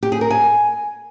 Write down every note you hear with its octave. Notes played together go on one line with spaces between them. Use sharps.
G4
G#4
A#4
G#5